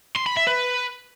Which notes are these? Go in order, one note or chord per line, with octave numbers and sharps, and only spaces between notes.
C6
B5
E5
B4